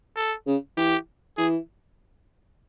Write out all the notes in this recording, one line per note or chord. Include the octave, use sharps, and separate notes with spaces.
A4
C#3
E3 G4
E3 G#4